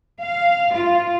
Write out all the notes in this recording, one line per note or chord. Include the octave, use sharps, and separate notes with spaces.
F5
F4